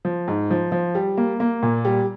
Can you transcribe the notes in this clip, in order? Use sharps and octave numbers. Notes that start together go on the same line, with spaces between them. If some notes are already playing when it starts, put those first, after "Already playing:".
F3
G#2
F3
F3
G3
A#3
A#3
A#2
G3